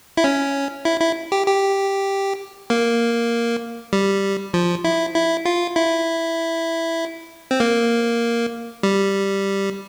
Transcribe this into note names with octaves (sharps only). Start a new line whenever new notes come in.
E4
C#4
E4
E4
G4
G4
A#3
G3
F3
E4
E4
F4
E4
C4
A#3
G3